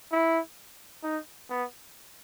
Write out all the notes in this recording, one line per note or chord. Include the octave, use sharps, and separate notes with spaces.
E4
D#4
B3